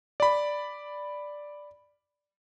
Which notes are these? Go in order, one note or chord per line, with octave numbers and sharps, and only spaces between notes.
D5 B5